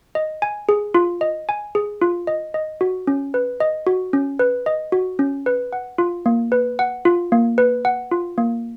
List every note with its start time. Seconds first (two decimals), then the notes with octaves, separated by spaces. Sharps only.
0.15 D#5
0.42 G#5
0.69 G#4
0.94 F4
1.21 D#5
1.49 G#5
1.75 G#4
2.02 F4
2.27 D#5
2.54 D#5
2.81 F#4
3.07 C#4
3.34 B4
3.60 D#5
3.87 F#4
4.13 C#4
4.39 B4
4.66 D#5
4.92 F#4
5.19 C#4
5.46 B4
5.73 F#5
5.98 F4
6.26 A#3
6.52 B4
6.79 F#5
7.05 F4
7.32 A#3
7.58 B4
7.85 F#5
8.11 F4
8.38 A#3